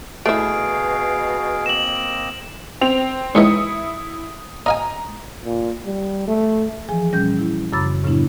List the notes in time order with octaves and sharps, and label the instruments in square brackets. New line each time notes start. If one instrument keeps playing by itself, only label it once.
[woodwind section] B2 [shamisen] A3 E4 [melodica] G#4 F5 [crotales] D7
[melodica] A#3 C4 D#5 [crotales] E7 F#7
[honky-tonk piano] C4 F7
[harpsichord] C#2 D#3 E3 [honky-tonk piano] E4 D#6 C#7
[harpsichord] D#5 F5 G#5 [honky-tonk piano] A#5
[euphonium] A#2
G3
A3
[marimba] E3 F3 G#4 G#5
A#2 G3 C#4 G6
E4
F#2 C#3 B5 D6 E6 A6
A2 C#3 F#3 B3 D4 E4